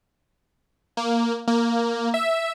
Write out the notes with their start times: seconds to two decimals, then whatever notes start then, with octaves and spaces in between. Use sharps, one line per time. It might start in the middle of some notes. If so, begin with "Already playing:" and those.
0.97 A#3
1.47 A#3
2.14 E5